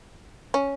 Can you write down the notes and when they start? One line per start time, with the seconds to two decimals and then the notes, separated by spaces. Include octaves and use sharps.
0.54 C#4